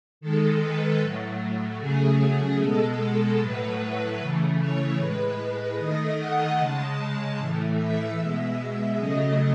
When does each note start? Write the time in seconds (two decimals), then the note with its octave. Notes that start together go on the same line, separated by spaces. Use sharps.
0.21 D#3 G#3 A4
0.61 B4
1.00 A2 F#3 A3
1.80 C#3 F#3 A3 G#4
2.60 B2 G#3 A4
3.39 A2 F#3 A3 B4
4.19 C#3 E3 A3
4.59 C#5
4.99 A2 G#3 B4
5.79 D#3 A3 D#5
6.18 F#5
6.59 C#3 G#3 A5
7.39 A2 E3 A3
7.78 E5
8.18 B2 G#3 E5
8.97 C#3 F#3 A3 D#5